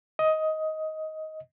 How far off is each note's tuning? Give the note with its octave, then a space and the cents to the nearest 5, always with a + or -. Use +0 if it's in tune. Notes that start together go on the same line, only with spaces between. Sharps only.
D#5 +15